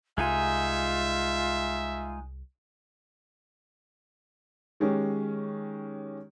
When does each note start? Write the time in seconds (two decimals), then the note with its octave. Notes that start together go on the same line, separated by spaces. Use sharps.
0.18 C2 G#3 D#4 F4 E5 G#5
4.80 D#3 G#3 C#4 G4